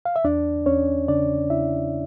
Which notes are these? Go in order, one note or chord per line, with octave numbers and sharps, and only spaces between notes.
F5
E5
E2 D4 D5
E2 C#4 C#5
C#3 D4 D5
C#3 E4 E5